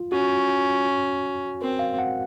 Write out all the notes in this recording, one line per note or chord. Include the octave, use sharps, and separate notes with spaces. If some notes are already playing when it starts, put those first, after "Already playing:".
Already playing: F4
C#4 F#4
C4 A#4
F5
F#5